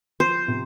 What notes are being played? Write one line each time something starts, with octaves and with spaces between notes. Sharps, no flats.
F3 C5
C3